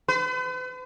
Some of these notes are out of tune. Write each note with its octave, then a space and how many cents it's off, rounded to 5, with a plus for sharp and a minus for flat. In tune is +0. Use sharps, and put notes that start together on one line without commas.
B4 +45